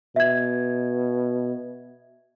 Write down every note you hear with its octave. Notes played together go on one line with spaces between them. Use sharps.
B2 E5 G#6